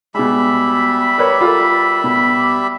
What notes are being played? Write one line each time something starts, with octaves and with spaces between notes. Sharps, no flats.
B2 G3 G#3 E5 B5
A#4 B4 C#5
F4 A4 A#4
B2